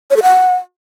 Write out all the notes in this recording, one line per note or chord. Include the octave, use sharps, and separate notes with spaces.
C#5
A4
F#5